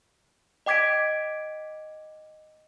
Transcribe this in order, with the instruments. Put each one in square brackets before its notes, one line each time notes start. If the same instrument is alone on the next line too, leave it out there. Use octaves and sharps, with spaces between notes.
[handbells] D#5 G5 D6 G#6 B6 D7